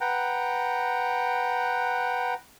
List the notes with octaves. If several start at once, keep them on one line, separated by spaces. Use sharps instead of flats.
B4 F#5 G5 A#5